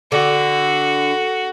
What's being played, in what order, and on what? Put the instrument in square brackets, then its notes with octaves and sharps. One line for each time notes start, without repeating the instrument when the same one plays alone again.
[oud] D3 [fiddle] F#4